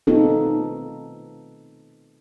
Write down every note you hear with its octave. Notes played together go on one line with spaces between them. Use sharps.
B3 C4 D#4 F4 A4